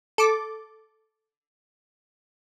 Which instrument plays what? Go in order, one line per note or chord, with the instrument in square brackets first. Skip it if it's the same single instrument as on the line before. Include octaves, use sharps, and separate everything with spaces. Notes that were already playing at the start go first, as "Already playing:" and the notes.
[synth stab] A4 D6